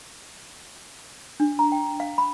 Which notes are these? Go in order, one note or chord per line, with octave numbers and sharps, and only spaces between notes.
D4
A#5
G5
F5
B5